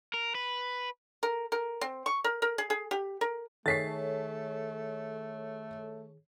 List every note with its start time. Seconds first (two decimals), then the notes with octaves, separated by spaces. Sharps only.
0.14 A#4
0.35 B4
1.23 A#4
1.52 A#4
1.81 C4
2.06 C#6
2.24 A#4
2.42 A#4
2.58 G#4
2.70 G#4
2.91 G4
3.21 A#4
3.66 D#3 A3 G#4 A4 C#5 A6 B6 C7